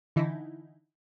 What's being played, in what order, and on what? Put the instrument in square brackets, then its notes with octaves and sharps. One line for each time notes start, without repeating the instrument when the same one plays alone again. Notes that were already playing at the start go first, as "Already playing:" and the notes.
[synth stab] D3 E3 D#4 E4